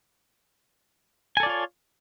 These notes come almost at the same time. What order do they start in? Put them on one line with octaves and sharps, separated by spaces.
G#5 A4 D5 F4 C#5